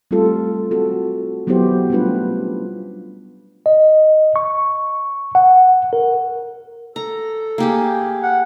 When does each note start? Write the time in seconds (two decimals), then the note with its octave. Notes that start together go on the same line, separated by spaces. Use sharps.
0.11 G3 A3 C4 F4 A4
0.71 C4 F#4 A4
1.47 F#3 B3 E4 F#4 G4 C5
1.90 G3 A3 C#4 D4 F4 B4
3.66 D#5
4.36 C#6
5.35 F#5
5.93 A#4
6.96 A4 A#5
7.58 A#3 G4 G#4
8.23 F#5